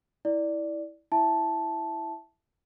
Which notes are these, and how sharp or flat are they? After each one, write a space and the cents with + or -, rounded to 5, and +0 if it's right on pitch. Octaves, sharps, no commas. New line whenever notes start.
E4 -15 D5 +0
E4 +0 E5 +0 A5 -10